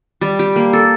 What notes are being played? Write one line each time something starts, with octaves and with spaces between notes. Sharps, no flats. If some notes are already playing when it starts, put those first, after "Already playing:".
G3
G4
A#3
A4